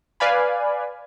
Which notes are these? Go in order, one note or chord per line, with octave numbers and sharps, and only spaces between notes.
B4 D5 F5 G#5 B5